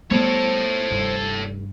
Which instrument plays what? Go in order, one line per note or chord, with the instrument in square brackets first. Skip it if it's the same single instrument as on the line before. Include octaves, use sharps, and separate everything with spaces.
[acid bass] G3 [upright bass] A3 B3 [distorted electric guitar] A4 C#5 [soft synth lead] C5
[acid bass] F1 [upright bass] G2